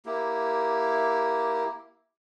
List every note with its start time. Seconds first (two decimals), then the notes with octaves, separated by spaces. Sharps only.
0.06 A#3 E4 G4